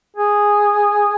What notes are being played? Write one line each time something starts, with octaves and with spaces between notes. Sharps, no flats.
G#4